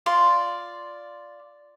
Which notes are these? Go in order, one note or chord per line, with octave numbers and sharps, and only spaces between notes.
F4 D5 C6